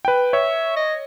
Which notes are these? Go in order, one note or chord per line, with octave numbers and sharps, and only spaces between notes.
B4 G5
C#5 E5
D#5